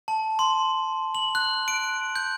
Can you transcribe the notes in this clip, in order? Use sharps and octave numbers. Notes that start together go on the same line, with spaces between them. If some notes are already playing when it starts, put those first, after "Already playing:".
A5
C6
F#7
F#6
D7
G6